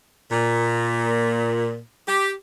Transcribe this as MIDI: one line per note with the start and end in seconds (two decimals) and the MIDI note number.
0.32 1.79 46
2.08 2.32 67